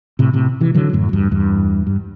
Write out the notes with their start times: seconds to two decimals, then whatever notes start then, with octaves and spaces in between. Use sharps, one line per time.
0.19 A2 C3
0.33 A2 C3
0.60 C3 E3
0.75 D3 F#3
0.93 F#2 A2
1.13 E2 G2
1.31 E2 G2
1.87 G2